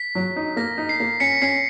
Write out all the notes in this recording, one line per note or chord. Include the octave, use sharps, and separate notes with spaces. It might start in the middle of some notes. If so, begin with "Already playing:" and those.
Already playing: B6
F#3
D#4
A#3 A#6
D#4
C7
A#3
C#4 B6 C#7
C#4 C7